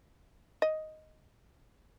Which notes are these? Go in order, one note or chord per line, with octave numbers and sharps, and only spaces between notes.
D#5